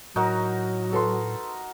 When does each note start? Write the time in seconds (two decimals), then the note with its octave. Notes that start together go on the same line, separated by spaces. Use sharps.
0.16 A2 F#3 D#4 F#4 A#4
0.93 A4 B4 C6